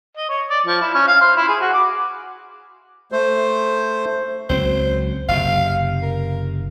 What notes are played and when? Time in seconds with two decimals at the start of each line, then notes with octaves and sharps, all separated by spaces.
0.17 D#5
0.29 C#5
0.50 D5
0.66 F3
0.81 E4
0.95 C#4
1.07 F5
1.21 C5
1.37 E4
1.48 G#4
1.61 F#4
1.73 D6
3.12 A3 C5
4.49 C#2 F#3 C4 C5
5.29 F#1 C3 F5
6.02 A#4